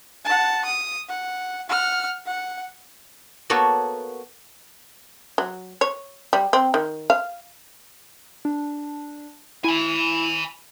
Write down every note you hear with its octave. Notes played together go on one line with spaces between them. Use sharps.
F#5 A5
D#6
F#5
F#5 F6
F#5
A#3 B3 F#4 A4 C#5
F#3
C#5
G3
C4
D#3
F5
D4
E4 G#5 B5